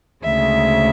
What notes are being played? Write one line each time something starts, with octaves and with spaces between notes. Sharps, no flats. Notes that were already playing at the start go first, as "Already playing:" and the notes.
D2 C#3 G#3 E5